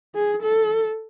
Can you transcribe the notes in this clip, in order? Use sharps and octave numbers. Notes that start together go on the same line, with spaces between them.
G#4
A4